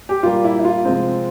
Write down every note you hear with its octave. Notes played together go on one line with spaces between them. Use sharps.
G4
A#2 G3 A#3 F4
E4
E4
F4
C3 F3 G#3 C4